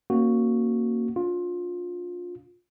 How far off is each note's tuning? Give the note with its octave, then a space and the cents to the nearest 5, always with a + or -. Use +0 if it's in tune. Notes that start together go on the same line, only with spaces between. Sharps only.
A#3 +0 C#4 -25 F#4 +0
D4 -35 F4 +20